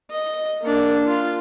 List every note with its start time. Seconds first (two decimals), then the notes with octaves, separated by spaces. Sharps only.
0.11 D#5
0.62 A#3 D4
1.07 F4